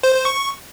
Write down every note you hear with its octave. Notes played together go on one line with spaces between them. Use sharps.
C5
C5
C#6